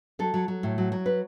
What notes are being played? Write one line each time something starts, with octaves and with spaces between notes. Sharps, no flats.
F#3 A4
F#3
F#3
A2
F#3
F#3
B4